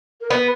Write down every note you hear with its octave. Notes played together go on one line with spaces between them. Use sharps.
A#4
B3 B4